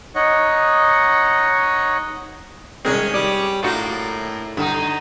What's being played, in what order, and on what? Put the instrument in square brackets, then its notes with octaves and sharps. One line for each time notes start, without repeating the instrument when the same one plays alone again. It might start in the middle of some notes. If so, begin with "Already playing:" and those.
[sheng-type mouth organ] D#4 C#5 D#5 F#5
[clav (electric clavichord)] C2 G#3 C4 [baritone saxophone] D#3 [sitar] C#4 G#4
[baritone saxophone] G3 [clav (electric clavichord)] D5
[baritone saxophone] A2 [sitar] A#3 D4 D#4 [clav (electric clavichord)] F4 F#4
[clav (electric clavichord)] G2 [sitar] D3 D#4